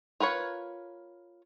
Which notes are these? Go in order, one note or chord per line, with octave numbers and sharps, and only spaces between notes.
F4 A#4 B4 C#5